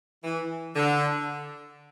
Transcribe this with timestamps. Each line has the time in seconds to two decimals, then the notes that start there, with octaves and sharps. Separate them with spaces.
0.24 E3
0.76 D3